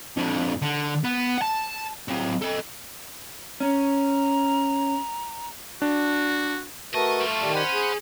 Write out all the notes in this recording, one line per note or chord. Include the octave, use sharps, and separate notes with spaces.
F2 D3
D3
B3
F#5 A5
F#3 C4
A4 D#5
C#4 A#5
D4 F#4
A3 F#4 A#4 B4 D#5 A5 C#6
G3 F4
D#3 G4 D5
C5 C#5 F#5 G#5 B5
G#4